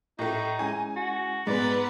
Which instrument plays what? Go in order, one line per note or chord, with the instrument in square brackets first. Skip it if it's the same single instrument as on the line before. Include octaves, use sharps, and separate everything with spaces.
[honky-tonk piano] A2 A3 [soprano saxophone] D#4
[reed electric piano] G#3 C#4 E4 [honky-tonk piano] G#5
[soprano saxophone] F#4
[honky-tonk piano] G#2 [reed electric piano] G#3 [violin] B3 B4 [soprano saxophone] D5